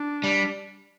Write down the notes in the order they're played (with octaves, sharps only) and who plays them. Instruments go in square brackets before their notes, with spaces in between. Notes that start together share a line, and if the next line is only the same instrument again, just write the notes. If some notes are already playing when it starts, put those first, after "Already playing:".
Already playing: [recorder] D4
[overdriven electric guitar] G3